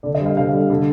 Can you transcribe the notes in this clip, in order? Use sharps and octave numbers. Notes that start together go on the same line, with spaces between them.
D3 D5
D#5
G3
F5
D3 F5
G3
D3